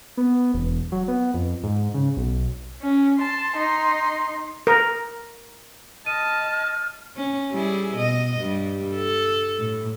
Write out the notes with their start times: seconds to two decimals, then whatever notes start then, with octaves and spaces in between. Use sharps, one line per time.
0.17 B3
0.54 E1
0.92 F#3
1.08 B3
1.34 F2
1.63 G#2
1.94 C#3
2.17 B1
2.82 C#4
3.18 A5 C6
3.56 D#4 C6
4.67 A#4
6.06 D#5 A5 F6 D#7
7.17 C#4
7.52 G3 E4 G#4
7.95 B2 D#5
8.40 G2 G3
8.95 A4
9.58 A2